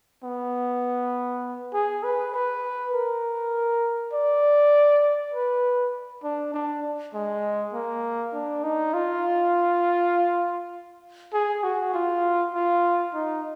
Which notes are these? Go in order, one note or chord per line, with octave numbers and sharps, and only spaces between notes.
B3
G#4
B4
B4
A#4
D5
B4
D4
D4
G#3
A#3
D4
D#4
F4
G#4
F#4
F4
F4
D#4